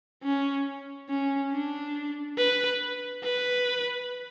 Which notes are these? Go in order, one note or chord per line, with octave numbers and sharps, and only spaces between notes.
C#4
C#4
D4
B4
B4